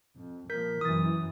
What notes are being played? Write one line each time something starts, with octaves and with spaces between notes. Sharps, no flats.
F2
A#2 F3 A#4 G6 B6
F#2 B2 E3 D#6 A6